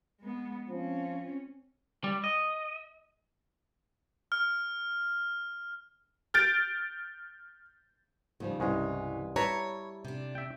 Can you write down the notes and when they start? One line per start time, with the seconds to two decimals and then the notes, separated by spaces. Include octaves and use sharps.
0.20 G#3 B3
0.70 F3 C4 C#4
2.04 G3
2.24 D#5
4.32 F6
6.34 F6 G6 A6 D7
8.40 D#2 C#3 F3 G3
8.60 C2 G2 E3 G#3 C#4
9.36 G3 E4 B4 C#5 A5 A#5
10.05 C3 D4
10.35 E5 G5